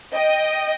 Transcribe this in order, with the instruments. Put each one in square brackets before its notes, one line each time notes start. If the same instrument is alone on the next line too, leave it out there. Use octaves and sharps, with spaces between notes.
[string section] D#5 G5